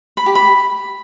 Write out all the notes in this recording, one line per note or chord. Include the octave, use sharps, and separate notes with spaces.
B5
G4
B5